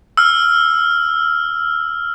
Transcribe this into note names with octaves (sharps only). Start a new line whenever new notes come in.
E6 F6